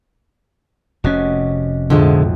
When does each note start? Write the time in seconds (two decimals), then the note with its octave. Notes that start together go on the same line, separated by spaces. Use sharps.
1.04 F1 C3 C#4 F#4 C#5 D#5
1.90 B1 F2 A2 D3 F3 G#3